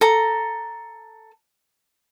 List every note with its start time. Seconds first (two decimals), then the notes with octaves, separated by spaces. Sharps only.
0.01 A4 A#5